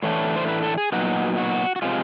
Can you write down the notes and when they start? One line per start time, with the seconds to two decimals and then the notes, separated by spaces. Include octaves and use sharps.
0.03 A2 E3 A3 D4 C#5
0.36 C5
0.48 B4
0.63 A4
0.78 G#4
0.92 A#2 F#3 B3 D#4 F#4
1.37 F#4
1.76 F#4
1.82 C3 F3 G#3 F4